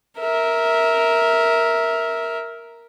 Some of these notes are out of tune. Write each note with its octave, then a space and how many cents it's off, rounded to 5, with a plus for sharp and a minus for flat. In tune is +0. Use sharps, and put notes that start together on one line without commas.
A#4 +0 E5 -15